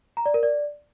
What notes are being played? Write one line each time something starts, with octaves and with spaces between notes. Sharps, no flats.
A#5
D5
A#4
D5